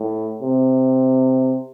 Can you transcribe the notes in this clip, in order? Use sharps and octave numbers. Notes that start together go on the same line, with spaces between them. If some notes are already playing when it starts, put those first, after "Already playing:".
Already playing: A2
C3